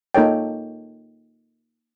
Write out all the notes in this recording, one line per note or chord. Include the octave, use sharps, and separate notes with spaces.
A#3 D#4 A4 C#5 G5